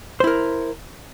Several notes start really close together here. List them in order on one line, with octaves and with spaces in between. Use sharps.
C5 E4 A#4